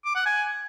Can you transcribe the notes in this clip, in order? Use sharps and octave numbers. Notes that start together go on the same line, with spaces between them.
D6
F#5
G#5